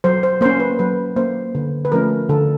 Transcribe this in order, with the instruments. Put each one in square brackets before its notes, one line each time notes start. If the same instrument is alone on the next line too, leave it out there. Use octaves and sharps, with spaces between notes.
[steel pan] F#3 C5
C5
A#3 C#4 C5
B4
F#3 B4
A#3 C#4 C5
D3 B4
B4
F3 A3 C#4 A#4
D3 A4